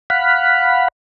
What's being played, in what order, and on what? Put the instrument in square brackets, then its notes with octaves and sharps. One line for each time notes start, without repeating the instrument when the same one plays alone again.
[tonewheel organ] F5 F#5 B5